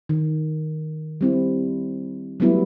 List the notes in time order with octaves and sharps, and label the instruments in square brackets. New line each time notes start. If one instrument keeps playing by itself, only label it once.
[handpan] D#3
G3 C4 E4
F#3 G3 A3 B3 E4